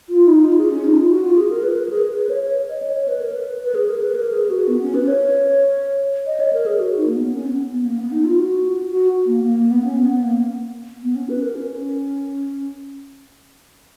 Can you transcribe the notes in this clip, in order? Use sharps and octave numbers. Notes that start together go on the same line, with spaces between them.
F4
D#4
F4
G#4
C#4
D#4
F4
F#4
F4
G#4
A#4
B4
A#4
G#4
B4
C#5
C#5
D#5
C#5
C#5
B4
A#4
B4
B4
G#4
A#4
B4
A#4
G#4
F#4
B3
C#4
B4
C#5
D#5
C#5
A#4
G#4
F#4
D#4
A#3
B3
C#4
B3
B3
A#3
B3
D#4
F4
F#4
F#4
A#3
A#3
A#3
B3
C#4
B3
B3
A#3
B3
C#4
B4
A#4
C#4